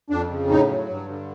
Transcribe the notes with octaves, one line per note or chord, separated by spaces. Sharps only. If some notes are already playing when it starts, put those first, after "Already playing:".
F2 D4
C#3
A2 D#4
F#3
G2
D3